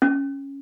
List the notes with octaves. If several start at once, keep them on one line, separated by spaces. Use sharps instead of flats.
C#4